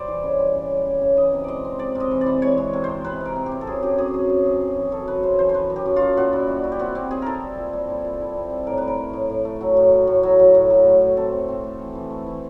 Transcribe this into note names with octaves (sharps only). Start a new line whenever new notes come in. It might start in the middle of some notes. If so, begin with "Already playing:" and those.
Already playing: G3 C5 D5
E3
C#3
G3
C#3
G3
C#3
C#3
E3 D#5
C3
G#3 D5 D#5
C4
G#3 D5
C3
D#5
E3
D5
E3
G#3 C#5
G#3
C3
C5
C3
C3 B4
C3 A#4
C4
G4
C4
A4
F#2 G#4
F#2 G4
F#2 G#4
F#2 G#4
F#2
F#2
F#2
E3
F#2 A4
F#2 B4
C#3 C5
E3 C5
C5
F#2 B4
F#2
G4
F#2
F4
F#2
A#2 F#4
E4
G3
E4
G4
C4 F#4
C4 G4
C4 G#4
E4 A4 A#4
G3
A#2
G3
E4
A#2
E4
C4
G3
A2 A#4
A2 B4
A#4
A3
A2
A2
A3
F#3
A2
A3
A2
F#3
F#3
A2
F#3
A2
A2
C4 A4
C4
C4
A3
E3
E3
A3
E3